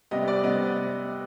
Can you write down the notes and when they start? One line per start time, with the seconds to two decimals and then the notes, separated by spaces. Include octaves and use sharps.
0.11 C3 G3 B3 D#5
0.28 D5
0.44 C3 G3 B3 D#5